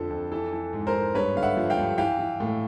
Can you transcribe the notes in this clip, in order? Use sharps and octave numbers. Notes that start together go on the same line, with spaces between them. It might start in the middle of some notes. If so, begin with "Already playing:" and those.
Already playing: F2 D3 F3 A4
F2
E3 A4
E3
G#2
A#4 C5
G#2
G2 B4 C#5
D3 F5
E5 F#5
F3
F5 G5
G2
E3 F5 G5
E3
A2